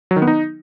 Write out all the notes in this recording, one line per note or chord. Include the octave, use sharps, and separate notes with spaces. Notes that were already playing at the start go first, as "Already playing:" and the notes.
F#3
D#3
B3
D#4